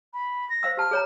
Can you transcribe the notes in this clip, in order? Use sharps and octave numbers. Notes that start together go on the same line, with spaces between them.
B5
A#6
C5 F5 E6
G4 A5 F6
G#4 C#5 A#5